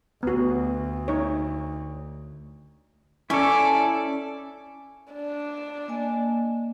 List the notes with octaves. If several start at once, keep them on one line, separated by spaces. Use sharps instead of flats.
D2 B3 F#4
D#4 C#5
C#4 E4 A4 D5
D4
A#3 D#5 G#5